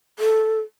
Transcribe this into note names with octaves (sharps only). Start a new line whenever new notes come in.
A4